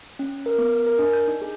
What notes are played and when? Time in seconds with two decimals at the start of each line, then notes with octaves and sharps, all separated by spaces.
0.19 C#4
0.46 A#4
0.58 B3
0.86 A#4
0.99 D4
1.13 G6
1.28 D#4
1.42 G#4